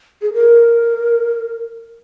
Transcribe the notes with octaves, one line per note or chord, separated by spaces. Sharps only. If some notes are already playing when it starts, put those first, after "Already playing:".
G#4
A#4